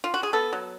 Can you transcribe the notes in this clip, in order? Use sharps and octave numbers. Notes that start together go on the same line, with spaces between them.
F4
F#4
G#4
B3 A4
F#3